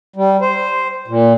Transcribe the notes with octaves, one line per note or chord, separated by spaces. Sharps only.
G3
C5
A#2